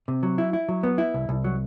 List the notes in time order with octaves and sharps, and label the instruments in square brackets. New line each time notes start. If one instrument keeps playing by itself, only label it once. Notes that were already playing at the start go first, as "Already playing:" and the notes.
[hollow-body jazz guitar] C3
F#3
E4
E4
F#3
B3
E4
C2
C2
F#3